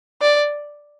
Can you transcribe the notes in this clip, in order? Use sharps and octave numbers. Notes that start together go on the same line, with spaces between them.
D5